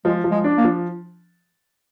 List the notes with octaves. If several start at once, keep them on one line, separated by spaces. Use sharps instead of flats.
F3 G#3
F3
G#3
D4
A#3
F3